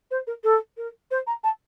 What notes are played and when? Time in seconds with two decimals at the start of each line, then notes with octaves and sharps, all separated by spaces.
0.11 C5
0.27 A#4
0.43 A4
0.77 A#4
1.11 C5
1.27 A#5
1.43 A5